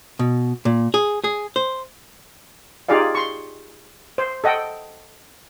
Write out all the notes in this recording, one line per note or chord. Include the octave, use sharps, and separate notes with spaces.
B2
A#2
G#4
G#4
C5
D#4 F4 G4 G#4 D5 F5
C6 C#6
C5
A4 D#5 F#5 G5